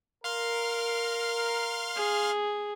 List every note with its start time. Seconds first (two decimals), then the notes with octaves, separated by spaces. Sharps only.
0.24 A#4 F5 C6 F6
1.96 G#4